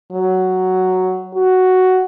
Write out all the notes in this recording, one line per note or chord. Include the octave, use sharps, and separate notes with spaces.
F#3
F#4